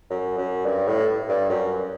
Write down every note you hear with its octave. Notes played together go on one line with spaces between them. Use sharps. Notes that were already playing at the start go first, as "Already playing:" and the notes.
F#2
F#2
G2
A2
G2
F#2